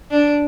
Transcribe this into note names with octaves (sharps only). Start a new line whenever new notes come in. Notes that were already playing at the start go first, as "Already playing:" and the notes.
D4